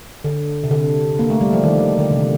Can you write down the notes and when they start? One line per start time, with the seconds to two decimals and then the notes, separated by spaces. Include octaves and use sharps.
0.24 D3
0.64 C3
0.71 D3
1.19 A#3
1.30 A3
1.41 G3
1.53 F3
1.63 D#3
1.99 D3
2.11 C3